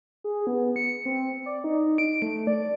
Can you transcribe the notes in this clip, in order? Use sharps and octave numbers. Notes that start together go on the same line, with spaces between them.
G#4
B3
C#7
C4
D5
D#4
D7
A3
D5